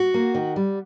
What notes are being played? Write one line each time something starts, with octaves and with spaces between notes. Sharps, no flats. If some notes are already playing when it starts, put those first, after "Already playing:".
Already playing: F#4
A#3
D#3
G3